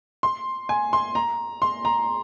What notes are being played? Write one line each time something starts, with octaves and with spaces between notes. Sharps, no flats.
C6
G#5
C6
A#5
C6
A#5